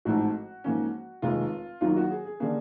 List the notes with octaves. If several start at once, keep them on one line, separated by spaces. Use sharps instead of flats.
A1 G#2 F3 A3 C4 F#4
G#2 F3 A#3 C#4
F1 D#2 D#3 G#3 F4
D#2 D#3 F#3 A#3 F4
F#4
G#4
G#4
D3 G3 A#3 C#4 G#4